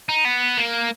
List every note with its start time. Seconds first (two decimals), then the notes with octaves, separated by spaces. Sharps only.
0.09 D#4
0.25 B3
0.57 A#3